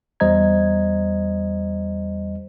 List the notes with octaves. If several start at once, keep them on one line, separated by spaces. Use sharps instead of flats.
E2 G3 C5 D#5 A#5 G#6